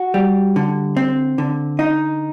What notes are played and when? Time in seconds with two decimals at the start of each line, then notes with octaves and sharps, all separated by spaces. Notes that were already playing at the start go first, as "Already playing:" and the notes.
Already playing: F#4
0.14 G3
0.56 D3
0.97 C4
1.38 D3
1.79 D#4